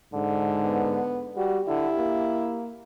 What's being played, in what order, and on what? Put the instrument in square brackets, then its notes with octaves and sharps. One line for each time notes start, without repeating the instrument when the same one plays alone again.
[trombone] G#2 [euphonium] D3
[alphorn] B3
[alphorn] G3 [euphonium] F#4 [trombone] G4
[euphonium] D3 [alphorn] E4
[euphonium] A#3